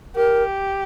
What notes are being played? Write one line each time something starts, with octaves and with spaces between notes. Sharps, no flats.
G4 A#4